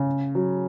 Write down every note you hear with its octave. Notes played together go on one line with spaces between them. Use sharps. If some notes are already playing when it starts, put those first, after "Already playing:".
Already playing: C#3
F#3